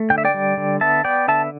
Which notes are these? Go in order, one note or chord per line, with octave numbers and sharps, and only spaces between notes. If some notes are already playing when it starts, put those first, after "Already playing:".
Already playing: A3
D3 G5
E5
D5 G5
G3
D3
B3 E5 A5
B3 D5 G5
D3 E5 A5